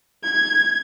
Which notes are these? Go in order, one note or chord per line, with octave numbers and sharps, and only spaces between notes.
G#6